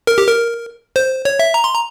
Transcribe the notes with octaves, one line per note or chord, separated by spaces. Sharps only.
A#4
G4
A#4
C5
C#5
E5
A#5
C6
A#5